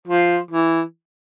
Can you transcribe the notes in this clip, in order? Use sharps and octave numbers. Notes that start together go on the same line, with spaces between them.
F3
E3